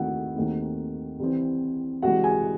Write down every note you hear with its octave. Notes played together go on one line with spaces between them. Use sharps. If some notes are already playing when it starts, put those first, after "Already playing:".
Already playing: D#2 D#3 A3 C4 E4 F#4 F#5
D#2 D#3 A3 C4
C2 C3 E3 C4
C2 C3 E3 G#3 F#4 F#5
G#4 G#5